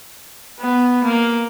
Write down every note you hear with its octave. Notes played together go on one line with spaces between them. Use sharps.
B3
A#3